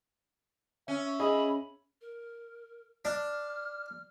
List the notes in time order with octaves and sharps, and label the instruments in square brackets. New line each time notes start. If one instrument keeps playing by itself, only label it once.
[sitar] C#4 [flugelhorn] E5
[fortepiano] G#4 D#5 [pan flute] B5
[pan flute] A#4
[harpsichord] D4 [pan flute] F6